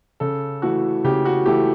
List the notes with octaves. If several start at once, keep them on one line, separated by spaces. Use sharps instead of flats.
C#3 A4
E3 A3 F#4
C#3 G4
F#4
E3 A3 G4